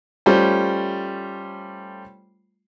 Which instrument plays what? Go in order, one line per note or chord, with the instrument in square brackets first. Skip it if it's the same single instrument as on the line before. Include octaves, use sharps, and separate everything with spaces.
[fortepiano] G3 A3 C#4 F4 C5